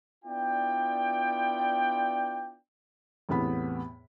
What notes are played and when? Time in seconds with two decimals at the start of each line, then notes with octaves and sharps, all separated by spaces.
0.25 B3 D4 E4 F4 D5 G5
3.29 E2 A2 C3 B3 B5